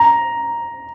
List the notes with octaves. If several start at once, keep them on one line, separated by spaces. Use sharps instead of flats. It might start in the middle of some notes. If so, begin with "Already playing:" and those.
Already playing: A#5